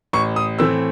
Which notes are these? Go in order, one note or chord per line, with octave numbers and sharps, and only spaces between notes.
A1 C#6
D#6
A2 E3 A3 C4 E6